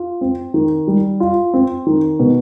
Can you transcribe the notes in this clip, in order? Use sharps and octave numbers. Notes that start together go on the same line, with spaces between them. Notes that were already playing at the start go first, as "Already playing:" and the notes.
Already playing: F4
C4
D#3
G3
F4
C4
D#3
B2